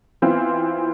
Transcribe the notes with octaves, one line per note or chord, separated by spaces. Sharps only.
E3 B3 C4 F4